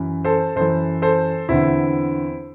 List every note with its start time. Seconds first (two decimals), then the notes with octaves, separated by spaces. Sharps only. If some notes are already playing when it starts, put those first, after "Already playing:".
Already playing: F#2 E3
0.25 A4 C5
0.56 F#2 E3 A4 C5
1.02 A4 C5
1.49 E2 D3 C4 E4